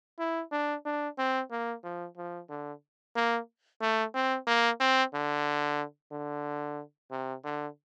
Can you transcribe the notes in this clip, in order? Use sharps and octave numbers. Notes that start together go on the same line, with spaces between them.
E4
D4
D4
C4
A#3
F3
F3
D3
A#3
A3
C4
A#3
C4
D3
D3
C3
D3